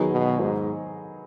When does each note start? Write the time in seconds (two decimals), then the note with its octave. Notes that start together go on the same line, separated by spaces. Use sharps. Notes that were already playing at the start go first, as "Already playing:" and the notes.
Already playing: D#3 F#3 B3 G#4 D#5
0.12 B2
0.41 G#2